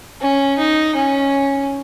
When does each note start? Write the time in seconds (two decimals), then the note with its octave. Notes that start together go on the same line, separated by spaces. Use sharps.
0.21 C#4
0.58 D#4
0.95 C#4